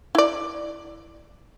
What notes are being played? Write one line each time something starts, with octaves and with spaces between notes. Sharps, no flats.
E4 D5